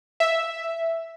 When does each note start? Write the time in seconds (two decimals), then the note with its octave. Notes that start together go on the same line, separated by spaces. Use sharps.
0.20 E5